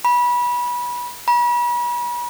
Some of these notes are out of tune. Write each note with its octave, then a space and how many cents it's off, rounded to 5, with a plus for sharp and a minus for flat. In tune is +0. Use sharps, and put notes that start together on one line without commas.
B5 -25
B5 -40